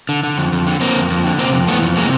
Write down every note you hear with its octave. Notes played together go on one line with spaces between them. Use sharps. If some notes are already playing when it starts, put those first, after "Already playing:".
D3
D3
F2
F2
D3
D3 A#3 C4
F2
F2
D3
C3 A#3 C4
F2
E3 A3 B3
F2
C3 G#3 A#3